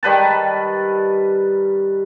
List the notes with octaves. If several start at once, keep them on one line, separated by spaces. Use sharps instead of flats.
D#3 G3 B4 A5